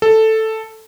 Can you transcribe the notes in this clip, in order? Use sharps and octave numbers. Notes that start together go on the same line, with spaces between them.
A4